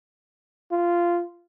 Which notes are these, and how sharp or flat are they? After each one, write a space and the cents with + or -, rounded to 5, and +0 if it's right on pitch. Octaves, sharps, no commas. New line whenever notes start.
F4 -10